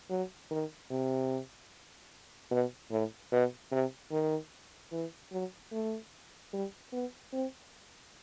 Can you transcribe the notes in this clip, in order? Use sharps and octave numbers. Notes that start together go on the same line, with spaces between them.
F#3
D#3
C3
B2
A2
B2
C3
D#3
E3
F#3
A3
G3
B3
C4